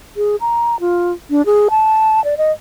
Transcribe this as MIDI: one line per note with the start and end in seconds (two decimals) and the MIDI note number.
0.17 0.36 68
0.41 0.79 82
0.80 1.13 65
1.30 1.45 62
1.46 1.68 68
1.70 2.23 81
2.24 2.37 74
2.38 2.52 75